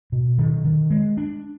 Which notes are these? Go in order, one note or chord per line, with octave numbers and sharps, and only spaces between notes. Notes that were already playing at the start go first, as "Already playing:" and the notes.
B2
D#3
D#3
G#3
D4